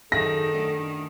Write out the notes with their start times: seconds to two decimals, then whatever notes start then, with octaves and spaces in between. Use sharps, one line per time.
0.12 F#2 D#3 D#4 G#4 A4 A#6
0.54 F#2 A3 D4